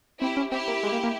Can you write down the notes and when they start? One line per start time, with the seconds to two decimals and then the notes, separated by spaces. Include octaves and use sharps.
0.21 C4 E4 G4
0.37 C#4
0.51 C4 E4 G4
0.68 A#3
0.83 G#3
0.92 A#3
1.04 A#3